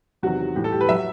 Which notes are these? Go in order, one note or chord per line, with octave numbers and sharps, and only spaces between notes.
E2 C3 D#3 F#3 F#4
A2 E3 G3 G4
A4
G4
B4
F#3 E5